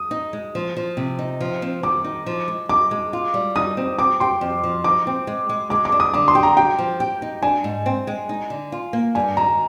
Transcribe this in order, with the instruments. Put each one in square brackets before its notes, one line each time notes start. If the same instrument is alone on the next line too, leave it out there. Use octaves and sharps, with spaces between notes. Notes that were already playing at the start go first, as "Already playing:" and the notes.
Already playing: [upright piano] D#6
[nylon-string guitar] D#4
G#3
F3
F3
C3
D#4
F3
C4
[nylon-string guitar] D#3 [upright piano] D6
[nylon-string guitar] D#4
F3
G#3
[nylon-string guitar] D#4 [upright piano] D6
[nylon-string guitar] G#3
F4
G3
[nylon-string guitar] D#4 [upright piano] D#6
[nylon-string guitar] C4
[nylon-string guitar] C4 [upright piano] D6
[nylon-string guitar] G4 [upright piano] C6
[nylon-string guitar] F2
F3
[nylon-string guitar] D#4 [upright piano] D6
[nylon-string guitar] C4
G#3
G#3
[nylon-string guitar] G#3 [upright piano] D6
[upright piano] D6
[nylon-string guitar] D4
[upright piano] D#6
[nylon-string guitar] D3 [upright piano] D6
[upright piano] C6
[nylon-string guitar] G4
[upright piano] A#5
[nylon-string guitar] G4 [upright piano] G5
[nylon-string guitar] F3
G4
D#4
[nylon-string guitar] D4 [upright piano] G#5
[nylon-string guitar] G#2
C4
G#3
D#4
D3
F4
A#3
[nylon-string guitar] G2 [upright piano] G#5
[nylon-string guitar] D#3 [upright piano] A#5